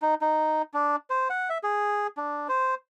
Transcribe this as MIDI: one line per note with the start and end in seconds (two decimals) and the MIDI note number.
0.02 0.15 63
0.21 0.62 63
0.74 0.96 62
1.10 1.28 72
1.30 1.49 78
1.50 1.58 76
1.63 2.07 68
2.17 2.47 62
2.49 2.75 72